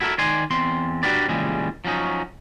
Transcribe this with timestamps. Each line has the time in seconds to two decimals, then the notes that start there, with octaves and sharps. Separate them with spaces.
0.01 E4 F#4 A4 A#4 E5
0.18 D#3 D5 G#5 C6
0.50 E2 C4 C6
1.03 D4 F#4 G4 A#4 B4 D5
1.29 A#2 C#3 E3 G3 G#3
1.85 F3 F#3 C#4 D#4